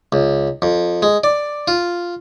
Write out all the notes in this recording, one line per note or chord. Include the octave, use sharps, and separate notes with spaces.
C#2
F2
G#3
D5
F4